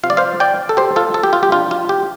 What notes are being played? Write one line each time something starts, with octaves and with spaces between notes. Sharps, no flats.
C3 F3 C4 F4 F5
D5
C5 F5
D5 G5
A4
G4 C5
F4 A4
A4
G4
F4
G4
C3 F3 D4 F4
F4
G4